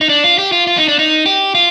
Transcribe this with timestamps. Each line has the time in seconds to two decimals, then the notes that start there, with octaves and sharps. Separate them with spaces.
0.01 D#4
0.09 D4
0.24 F4
0.38 G4
0.52 F4
0.67 F4
0.77 D#4
0.88 D4
0.99 D#4
1.26 G4
1.55 F4